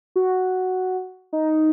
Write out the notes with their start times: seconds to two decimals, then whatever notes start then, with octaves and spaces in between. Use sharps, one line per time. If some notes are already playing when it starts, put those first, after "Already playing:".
0.16 F#4
1.33 D#4